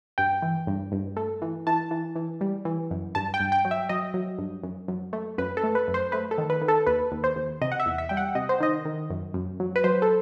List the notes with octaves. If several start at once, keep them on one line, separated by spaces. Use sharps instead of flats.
G2 G5
E3
G2
G2
A3
E3
E3 A5
E3
E3
G3
E3
F#2
G2 A5
G5
G2
G5
F#3
E5
F#3 D#5
F#3
G2
F#2
F#2
A3
F#2 B4
A4
A3
B4
F#2
C5
A3 B4
A4
D#3
B4
D#3
A4
D#2 B4
D#2
C5
D#2
C3 D#5
F#5
E5
E2
E5
G3 G5
F#5
C3 D#5
C5
D#3 D#5
D#3
F#2
F#2
F#3
B4
F#3 C5
A4